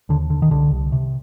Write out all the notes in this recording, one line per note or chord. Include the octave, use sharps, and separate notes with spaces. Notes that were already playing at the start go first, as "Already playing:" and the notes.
D#2 D3
D3
D#3
C2 D3
C2
C3